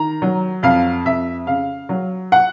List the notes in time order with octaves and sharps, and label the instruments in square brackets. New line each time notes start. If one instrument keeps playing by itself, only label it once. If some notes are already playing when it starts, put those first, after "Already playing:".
Already playing: [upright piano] D#3 A#5
F#3
F2 F5
F2 E5
C#3 F5
F#3
F#5